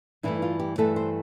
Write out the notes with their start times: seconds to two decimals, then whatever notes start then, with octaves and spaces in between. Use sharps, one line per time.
0.23 G2 E3 A3 E4
0.42 F4
0.59 G4
0.78 G2 E3 A3 A4
0.96 C5